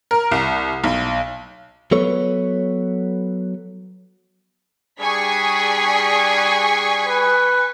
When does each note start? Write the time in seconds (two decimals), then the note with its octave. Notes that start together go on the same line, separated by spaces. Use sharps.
0.11 A#4
0.32 C2
0.84 B1
1.91 F#3 B3 A4 B4 C#5
5.01 G3 D4 G#4 G#5 C#6 B6
7.06 B4